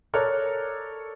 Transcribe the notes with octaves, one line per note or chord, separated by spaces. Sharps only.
A4 A#4 C#5 D5 F6 F#6